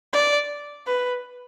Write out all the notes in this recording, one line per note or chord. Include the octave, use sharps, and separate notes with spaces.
D5
B4